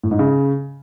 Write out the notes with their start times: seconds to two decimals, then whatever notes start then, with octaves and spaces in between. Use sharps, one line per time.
0.04 A2
0.11 G#2
0.19 C#3